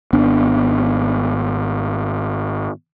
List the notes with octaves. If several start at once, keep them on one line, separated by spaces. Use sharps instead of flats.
G#1 B3 D4